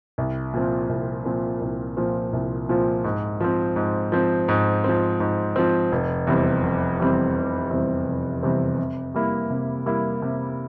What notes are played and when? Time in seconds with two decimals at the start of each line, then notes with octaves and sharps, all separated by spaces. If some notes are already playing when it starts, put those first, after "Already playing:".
0.18 C2
0.54 A#2 F3 C4
0.89 C2
1.25 A#2 F3 C4
1.61 C2
1.97 A#2 F3 C4
2.33 C2
2.69 A#2 F3 C4
3.04 G#2
3.40 F3 C4
3.76 G#2
4.12 F3 C4
4.48 G#2
4.84 F3 C4
5.20 G#2
5.56 F3 C4
5.92 F1
6.27 E2 C3 G3 C4
6.63 F1
6.99 E2 C3 G3 C4
7.35 F1
7.71 E2 C3 G3 C4
8.07 F1
8.43 E2 C3 G3 C4
8.78 C3
9.14 G3 A#3 E4
9.50 C3
9.86 G3 A#3 E4
10.22 C3